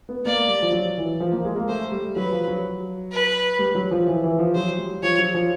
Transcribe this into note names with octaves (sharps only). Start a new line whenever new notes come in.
B3
A#3 D5
G3
F3
F#3
E3
F3
A#3
G#3
A#3
A3 C5
G3
F#3 B4
F3
F#3
B4
G3
F#3
F3
E3
E3
F3
F#3 C5
G3
F3 C#5
F#3
F3